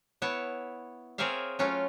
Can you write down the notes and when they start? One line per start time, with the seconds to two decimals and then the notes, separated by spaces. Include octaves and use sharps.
0.22 B3 E4 C#5 A5
1.18 C4 G#4 A#4 C#5 E5 F5
1.59 F#3 A3 C#4 F4